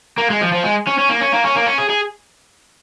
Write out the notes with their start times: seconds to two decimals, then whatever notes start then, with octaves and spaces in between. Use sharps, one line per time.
0.18 A#3
0.30 G#3
0.41 F3
0.53 F3
0.64 G#3
0.87 C#4
0.98 C#4
1.09 A#3
1.21 C#4
1.32 A#3
1.44 C#4
1.56 A#3
1.66 C#4
1.78 G#4
1.90 G#4